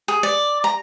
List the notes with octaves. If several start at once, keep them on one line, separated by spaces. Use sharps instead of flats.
G#4
D5
A#5